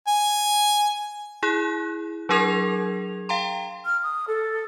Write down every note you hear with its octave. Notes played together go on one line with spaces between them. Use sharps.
G#5
E4 G#4 F#6
F#3 D4 G#4 A#4 G#6 F7
F5 G5 A#5 C6
F6
D#6
A4